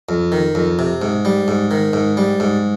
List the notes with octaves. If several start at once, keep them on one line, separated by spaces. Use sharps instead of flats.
F2
D#3
F2
C3
G#2
G3
G#2
D#3
G#2
G3
G#2